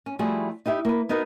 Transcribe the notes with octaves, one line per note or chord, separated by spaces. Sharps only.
C#4
F3 G3 A3 E4 F#4 G#4
D#4 E4 G4 E5
A#3 B4
B3 D#4 F#4 A#4